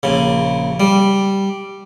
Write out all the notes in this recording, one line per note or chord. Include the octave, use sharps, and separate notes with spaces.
A#1 C#3
G3